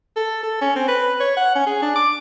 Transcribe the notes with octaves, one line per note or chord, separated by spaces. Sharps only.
A4
A4
C#4
C4
B4
C#5
F#5
C#4
G#4
D4
D6